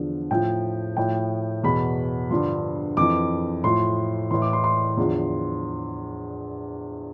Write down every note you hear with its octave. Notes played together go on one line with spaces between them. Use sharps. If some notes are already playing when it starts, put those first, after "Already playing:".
Already playing: E2 D3 F3
A2 F3 G5
A2 F3 G5
E2 B2 B5
G2 D3 F3 C6
F2 E3 D6
A2 F3 C6
A2 E3 C6
D6
C6
C6
E2 D3 F3